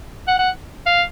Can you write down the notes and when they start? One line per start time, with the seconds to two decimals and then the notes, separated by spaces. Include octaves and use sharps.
0.28 F#5
0.39 F#5
0.86 F5